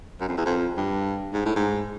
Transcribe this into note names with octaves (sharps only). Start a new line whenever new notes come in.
F#2
F2
E2
F2
G2
G#2
A2
G#2